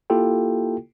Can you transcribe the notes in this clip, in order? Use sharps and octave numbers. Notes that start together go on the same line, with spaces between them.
A#3 E4 F4 G4 A4 G5